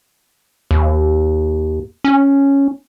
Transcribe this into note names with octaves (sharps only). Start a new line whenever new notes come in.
D#2
C#4